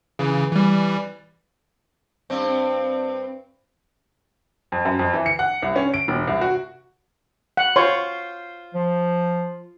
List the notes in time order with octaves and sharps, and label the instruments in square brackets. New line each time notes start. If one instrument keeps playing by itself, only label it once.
[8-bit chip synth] C#3 E3
E3 G3
[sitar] G2 C4
[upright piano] F2
F#2
F2
E3
C#7
F#5
C2
C#4
D7
E1
C2
F#4
[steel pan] F#5
[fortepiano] F4 C5 [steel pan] C#5
[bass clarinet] F3